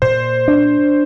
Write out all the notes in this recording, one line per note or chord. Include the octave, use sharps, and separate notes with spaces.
A#2 C5
D4